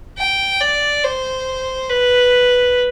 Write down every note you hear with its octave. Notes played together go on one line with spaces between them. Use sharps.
G5
D5
C5
B4